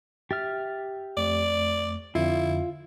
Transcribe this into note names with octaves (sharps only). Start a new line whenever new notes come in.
G4 E5 F6 A6
F2 A3 D5
F2 D3 C4 E4 F4